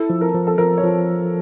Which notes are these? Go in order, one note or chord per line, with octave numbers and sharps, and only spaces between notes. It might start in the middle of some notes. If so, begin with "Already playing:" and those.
Already playing: E4 A4
F3
A#4
F3
A4
F3 A#4
C#5
F3